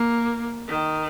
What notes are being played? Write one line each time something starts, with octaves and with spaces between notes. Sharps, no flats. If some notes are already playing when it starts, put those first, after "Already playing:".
Already playing: A#3
D#3